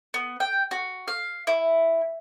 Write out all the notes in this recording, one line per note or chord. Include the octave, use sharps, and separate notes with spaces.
B3
G5
F#4
F5
E4